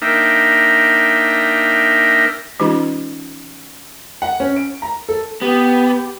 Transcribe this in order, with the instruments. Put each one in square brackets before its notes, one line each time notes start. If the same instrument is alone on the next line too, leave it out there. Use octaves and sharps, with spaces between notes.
[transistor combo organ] A#3 D4 D#4 A#4 E5 G5
[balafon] E3 G#3 C#4 D#4 F4 G4
[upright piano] F#5
C#4
D7
A#5
A4
[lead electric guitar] B3 [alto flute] G4